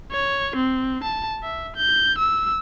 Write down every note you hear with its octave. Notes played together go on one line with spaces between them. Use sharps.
C#5
C4
A5
E5
G6
E6